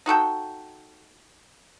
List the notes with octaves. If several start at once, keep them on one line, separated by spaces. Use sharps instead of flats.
D#4 F#4 A4 G5